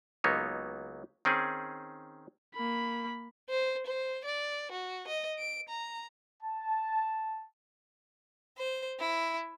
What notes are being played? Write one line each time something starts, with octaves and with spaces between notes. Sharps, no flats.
C#2 F#3 A#3 B3 D#4 C#5
D#3 C4 C#4 G#4
A#3 B5
C5
C5
D5
F#4
D#5
D7
A#5
A5
C5
E4